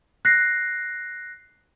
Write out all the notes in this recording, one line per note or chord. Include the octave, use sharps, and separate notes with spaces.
F#6 A#6 C7